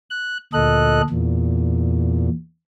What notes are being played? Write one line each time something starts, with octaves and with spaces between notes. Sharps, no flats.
F#6
D2 A#2 A4 D#5 F#6
E2 A#2